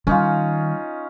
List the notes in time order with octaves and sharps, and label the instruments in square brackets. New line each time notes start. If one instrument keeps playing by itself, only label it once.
[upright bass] D#3 G3 [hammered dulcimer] C#4 D#4 F4